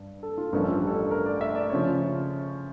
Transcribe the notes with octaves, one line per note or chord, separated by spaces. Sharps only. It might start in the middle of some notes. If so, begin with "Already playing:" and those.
Already playing: G2
A4
F4
A1 G2 F3 A3 C#4 A#4
A4
G4
A4
A#4
D5
E5
D5
C#3 F3 C#5